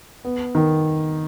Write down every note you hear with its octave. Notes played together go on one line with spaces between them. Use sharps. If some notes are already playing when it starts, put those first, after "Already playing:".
B3
D#3